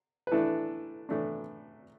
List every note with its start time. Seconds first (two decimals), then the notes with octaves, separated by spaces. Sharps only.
0.27 B4
0.32 A2 E3 A3 D4 E4 A4
1.09 A2 E3 A3 D4